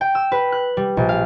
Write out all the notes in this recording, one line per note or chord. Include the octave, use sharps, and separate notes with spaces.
G5
E6
B4
F#6
G3
A#1
F5